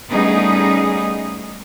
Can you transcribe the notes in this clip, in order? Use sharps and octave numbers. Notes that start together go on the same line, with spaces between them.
G3 A3 B3 C#4 D#4 G#4